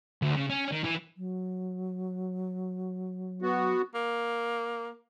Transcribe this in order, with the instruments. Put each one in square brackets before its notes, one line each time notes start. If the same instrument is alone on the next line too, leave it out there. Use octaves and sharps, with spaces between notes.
[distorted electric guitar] D2
C#3
C#4
D#3
E3
[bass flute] F#3
[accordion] B3 F#4
[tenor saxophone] A#3